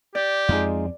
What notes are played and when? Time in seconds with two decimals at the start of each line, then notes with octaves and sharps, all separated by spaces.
0.15 G4 D5
0.49 F2 G#3 C4 D#4 F4